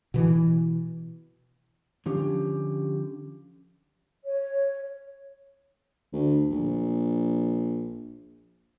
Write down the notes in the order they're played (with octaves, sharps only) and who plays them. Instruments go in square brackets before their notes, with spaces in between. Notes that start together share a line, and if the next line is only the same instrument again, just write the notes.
[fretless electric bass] B2 E3
[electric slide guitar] D3 F3 C#4 G4
[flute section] C#5
[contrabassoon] D2
A#1